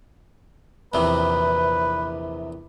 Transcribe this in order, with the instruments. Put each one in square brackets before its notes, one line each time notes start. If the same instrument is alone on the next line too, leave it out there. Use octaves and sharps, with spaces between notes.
[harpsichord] A#1 E2 C3 [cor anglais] B4